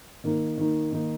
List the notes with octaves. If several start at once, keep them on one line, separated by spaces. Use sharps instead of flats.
D#3 A#3 D#4
D#3 A#3 D#4
D#3 A#3 D#4